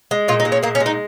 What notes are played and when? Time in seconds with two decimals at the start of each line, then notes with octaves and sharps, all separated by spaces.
0.11 G#3
0.28 A#2 F4
0.40 D#4
0.45 G#3
0.52 C#4
0.63 A#2 A#3
0.75 C#4
0.80 G#3
0.86 D#4